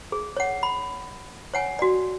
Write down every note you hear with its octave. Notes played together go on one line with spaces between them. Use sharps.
G#4
C#5 F#5
B5
C#5 F#5 G#5
F#4 D5